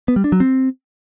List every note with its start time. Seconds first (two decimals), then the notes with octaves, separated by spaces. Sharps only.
0.08 B3
0.16 G3
0.24 D4
0.32 F#3
0.40 C4